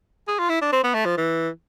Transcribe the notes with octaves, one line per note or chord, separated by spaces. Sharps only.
G#4
F4
E4
D4
C4
B3
A3
F3
E3